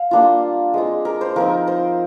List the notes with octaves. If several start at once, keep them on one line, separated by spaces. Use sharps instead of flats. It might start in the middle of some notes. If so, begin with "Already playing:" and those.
Already playing: F5
G3 A#3 D4 F4
G#3 C4 F4
A#4
C5
F3 C4 D#4 A#4
C5